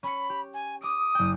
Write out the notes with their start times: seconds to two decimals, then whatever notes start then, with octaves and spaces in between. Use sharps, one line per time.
0.03 C#4 B5 C#7
0.30 G4
0.53 G#5
0.81 D6 D#6 D7
1.15 F#1 G5